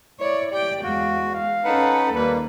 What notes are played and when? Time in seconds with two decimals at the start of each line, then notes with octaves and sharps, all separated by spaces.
0.20 E4 C#5 D5
0.52 G4 D5 G5
0.83 E2 G#3 F#4 F5
1.33 F5
1.65 C#4 D#4 A4 B4 F#5
2.15 D#2 G3 A#3 B4